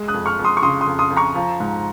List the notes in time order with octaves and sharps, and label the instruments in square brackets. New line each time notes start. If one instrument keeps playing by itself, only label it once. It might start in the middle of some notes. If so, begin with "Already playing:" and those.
Already playing: [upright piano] G#3
D#6 F#6
F2
C#6 F6
F2
C6 D#6
C#6
C#3 C6 D#6
C6 D#6
F2
C6 D#6
F2
A#5 C#6
F3
G#2